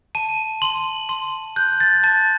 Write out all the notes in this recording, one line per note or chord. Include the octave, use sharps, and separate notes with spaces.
A5 D#7
C6 F#7
C6
F#6 G6
A6
A5 A6